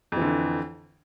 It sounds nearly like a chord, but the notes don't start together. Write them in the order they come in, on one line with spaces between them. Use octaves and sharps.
F2 E3 D3